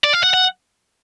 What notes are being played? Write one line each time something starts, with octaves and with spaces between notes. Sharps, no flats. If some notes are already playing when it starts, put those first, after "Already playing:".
D5
F5
F#5
F#5